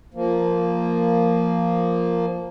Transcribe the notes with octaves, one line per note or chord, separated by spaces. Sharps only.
F3 A#3